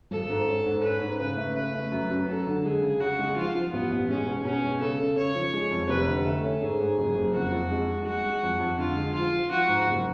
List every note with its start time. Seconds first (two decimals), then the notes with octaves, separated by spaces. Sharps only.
0.11 G#1 A4
0.30 G#2
0.48 C#4
0.66 G#2
0.84 C#4 B4
1.02 G#2
1.20 C#3 B4
1.37 A3
1.55 C#3 B4
1.74 A3
1.92 F#2
2.10 F#2
2.28 F#3 A4
2.47 D3
2.64 G#3 G#4
2.82 C#3
3.00 C#3 F#4
3.19 G#3
3.36 F3 F4
3.55 F3
3.73 A1 B3
3.90 A1
4.09 G#3 C#4
4.26 B2
4.44 B2 C#4
4.63 G#3
4.81 C#3 A4
4.99 C#3
5.16 C#3 C#5
5.35 F3
5.53 G#3
5.71 F2
5.89 F1 B4
6.08 D3
6.26 A3 A4
6.44 C#4
6.61 G#2 G#4
6.80 G#2
6.98 F#1
7.16 F#1
7.33 F2 F#4
7.52 F2
7.70 G#3
7.88 G#3
8.06 G#3 F#4
8.24 G#3
8.43 F2
8.60 F2
8.78 D3 F4
8.96 G#3
9.14 F3 F4
9.33 F3
9.51 F3 F#4
9.68 G#2
9.87 F#1